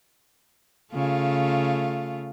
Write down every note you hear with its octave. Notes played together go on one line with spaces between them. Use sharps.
C#3 A3 F4